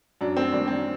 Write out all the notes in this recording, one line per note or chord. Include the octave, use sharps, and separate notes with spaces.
F#2 D4
C4
D#3 G3 A#3 D4
C4